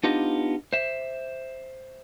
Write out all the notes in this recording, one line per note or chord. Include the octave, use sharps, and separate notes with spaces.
B3 D4 D#4 F4 G4 D#5
C5 E5